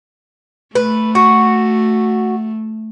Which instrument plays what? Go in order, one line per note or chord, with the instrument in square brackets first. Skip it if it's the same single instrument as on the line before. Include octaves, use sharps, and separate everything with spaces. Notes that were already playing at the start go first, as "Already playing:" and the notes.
[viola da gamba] A3 [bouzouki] B4
[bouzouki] F#4